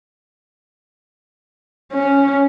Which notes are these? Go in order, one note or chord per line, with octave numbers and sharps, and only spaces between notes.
C#4